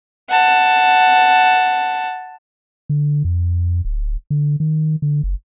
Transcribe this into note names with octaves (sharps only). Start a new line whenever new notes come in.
F#5 A5
D3
F2
D1
D3
D#3
D3
F#1